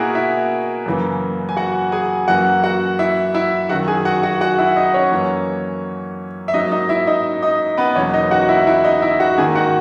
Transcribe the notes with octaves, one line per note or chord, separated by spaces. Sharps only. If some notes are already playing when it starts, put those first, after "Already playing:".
Already playing: B2 G#3 A#3 E4 F#4 G#4 A#4
E4 E5
F#2 C#3 E3 A#3
G#5
F#4 F#5
G#4 G#5
F#2 E3 A#3 F#4 F#5
F#4 F#5
E4 E5
E4 E5
F#2 D#3 F#3 F#4 F#5
G#4 G#5
F#4 F#5
F#4 F#5
F#4 F#5
E4 E5
D#4 D#5
C#4 C#5
F#2 E3 A#3
E5
G#2 F#3 A#3 D#4 D#5
D#4 D#5
E4 E5
D#4 D#5
D#4 D#5
B3 B4
E2 B2 F#3 A#3 C#4 C#5
D#4 D#5
F#4 F#5
E4 E5
E4 E5
D#4 D#5
E4 E5
F#4 F#5
G#2 D#3 A#3 G#4 G#5
F#4 F#5